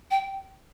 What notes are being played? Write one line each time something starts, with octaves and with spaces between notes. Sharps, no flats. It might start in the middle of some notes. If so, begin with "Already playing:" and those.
G5